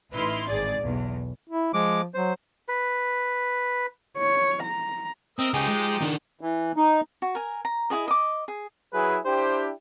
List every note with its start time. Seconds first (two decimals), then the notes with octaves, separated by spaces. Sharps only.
0.14 A1 D#4 E4 B4 C6 F6
0.47 G#1 G#2 G#4 D5 A6
0.81 B1 E2
1.50 E4
1.74 F3 G#3 D6
2.14 F#3 C5
2.69 B4
4.17 C#5
4.63 A#5
5.39 C4 A#4 D#5 E5
5.54 C#2 F3 D#4 G4 G#4
5.68 G#3
6.01 D#3 D4
6.41 E3
6.77 D#4
7.22 F#4
7.35 A#4 G#5
7.65 A#5
7.90 E4 F#4 G#4 D#5
8.08 D#5 D6
8.48 G#4
8.93 F#3 E4 G#4 B4
9.25 D4 E4 G4 C5